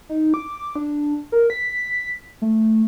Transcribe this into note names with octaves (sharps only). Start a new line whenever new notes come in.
D#4
D6
D4
A#4
B6
A3